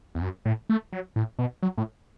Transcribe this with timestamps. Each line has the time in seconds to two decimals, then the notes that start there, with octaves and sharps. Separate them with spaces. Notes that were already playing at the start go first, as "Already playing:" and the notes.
0.15 E2
0.22 F#2
0.45 A2
0.69 A3
0.92 F#3
1.16 A2
1.39 B2
1.62 F#3
1.78 A2